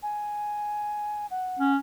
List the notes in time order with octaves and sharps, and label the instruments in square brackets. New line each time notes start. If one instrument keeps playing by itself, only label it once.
[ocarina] G#5
F#5
[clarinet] C#4